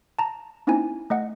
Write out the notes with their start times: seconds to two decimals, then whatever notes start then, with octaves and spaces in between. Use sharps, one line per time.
0.19 A5 A#5
0.67 A#3 C4 C#4 D#4 E4 G#5
1.10 A3 D#5 F#5